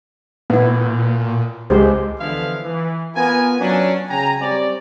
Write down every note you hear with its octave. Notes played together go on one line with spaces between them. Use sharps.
A#2 B3 E4
C#2 G#3 G4 C5
D3 E3 F3 B3 E4 F5
E3
B3 F4 A#4 G#5
F#3 C#4 D4
C#3 G5 G#5 A#5
G3 C4 C#5 D5